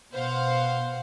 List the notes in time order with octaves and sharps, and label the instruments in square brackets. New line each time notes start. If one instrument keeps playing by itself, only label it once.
[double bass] B2 [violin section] C5 F5 F#5